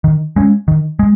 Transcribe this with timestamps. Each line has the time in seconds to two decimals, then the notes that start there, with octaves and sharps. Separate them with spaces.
0.04 D#3
0.36 G#3 C#4
0.68 D#3
0.99 G#3